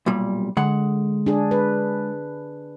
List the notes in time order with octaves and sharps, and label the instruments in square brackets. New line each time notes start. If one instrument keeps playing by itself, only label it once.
[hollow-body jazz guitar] B1 A#2 G3
[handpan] D3 [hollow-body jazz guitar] G#3 F#5
[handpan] D4 G#4
B4